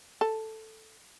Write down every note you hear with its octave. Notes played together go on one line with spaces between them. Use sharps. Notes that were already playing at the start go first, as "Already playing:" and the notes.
A4